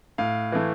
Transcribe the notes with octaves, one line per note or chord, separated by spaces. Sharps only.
A2 F5
E3 A3